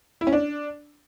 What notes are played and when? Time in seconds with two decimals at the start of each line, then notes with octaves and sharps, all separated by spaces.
0.21 E4
0.27 C#4
0.33 D4